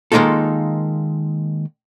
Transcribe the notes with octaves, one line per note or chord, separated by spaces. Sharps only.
D#3 G#3 A#3 D#4 F4 A4